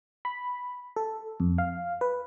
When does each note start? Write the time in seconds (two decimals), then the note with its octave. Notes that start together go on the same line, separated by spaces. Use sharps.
0.25 B5
0.96 A4
1.40 F2
1.58 F5
2.01 B4